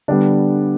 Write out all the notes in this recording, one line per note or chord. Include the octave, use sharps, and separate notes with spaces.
D3 G3 B3 D4 D5